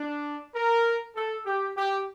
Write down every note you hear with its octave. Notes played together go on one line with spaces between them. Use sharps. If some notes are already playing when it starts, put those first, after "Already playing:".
Already playing: D4
A#4
A4
G4
G4